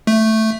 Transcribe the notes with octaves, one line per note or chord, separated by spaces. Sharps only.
A3